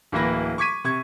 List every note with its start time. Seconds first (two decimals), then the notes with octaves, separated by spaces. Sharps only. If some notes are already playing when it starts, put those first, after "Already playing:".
0.12 D1 E3 A#3 E4 B4 A#6
0.58 C#6 D6 G#6 B6 D#7
0.84 C3 C#6 G#6